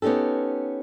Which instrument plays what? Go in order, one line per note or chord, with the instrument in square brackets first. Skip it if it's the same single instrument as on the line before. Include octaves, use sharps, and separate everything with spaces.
[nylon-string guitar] B3 C#4 D#4 G4 A4